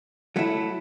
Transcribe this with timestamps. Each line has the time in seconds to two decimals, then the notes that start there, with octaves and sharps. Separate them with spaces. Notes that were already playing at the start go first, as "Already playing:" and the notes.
0.36 F#3 A3 E4